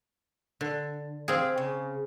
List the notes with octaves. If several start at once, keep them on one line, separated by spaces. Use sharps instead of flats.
D3
C4 G4 G#4 F5
C#3